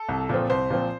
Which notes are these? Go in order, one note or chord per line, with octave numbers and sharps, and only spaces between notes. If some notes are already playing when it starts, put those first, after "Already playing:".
Already playing: A4
C2
A#2 F3 C4
C2 C5
A#2 F3 C4